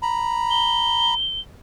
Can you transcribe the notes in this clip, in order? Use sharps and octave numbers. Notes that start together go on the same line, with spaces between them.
A#5 B5
G7